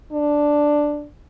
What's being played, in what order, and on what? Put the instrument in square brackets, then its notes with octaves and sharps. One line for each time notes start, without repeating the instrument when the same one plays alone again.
[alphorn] D4